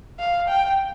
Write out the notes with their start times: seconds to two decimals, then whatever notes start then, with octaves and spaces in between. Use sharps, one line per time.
0.19 F5
0.48 G5